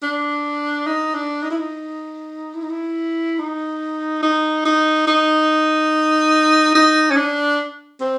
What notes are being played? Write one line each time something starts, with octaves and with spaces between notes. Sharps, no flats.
D4
D#4
D4
D#4
E4
D#4
E4
D#4
E4
D#4
D#4
D#4
D#4
D#4
C#4
D4
C4